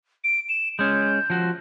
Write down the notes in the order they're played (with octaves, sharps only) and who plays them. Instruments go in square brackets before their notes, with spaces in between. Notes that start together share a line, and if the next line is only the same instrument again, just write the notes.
[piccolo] D7
E7
[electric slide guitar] G#3 C#4 [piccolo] G6
[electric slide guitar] F3 F#4